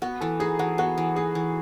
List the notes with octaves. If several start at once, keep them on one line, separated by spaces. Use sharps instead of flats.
B3 F#4
E3 A4
D#4 G#4
E3 F#4
B3 F#4
E3
D#4 G#4
E3